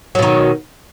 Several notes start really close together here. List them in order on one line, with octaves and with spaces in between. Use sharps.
F#3 B2 D#3